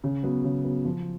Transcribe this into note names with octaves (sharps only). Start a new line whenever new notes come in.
C#3
F#3 B3
C#3
F#3 B3
F3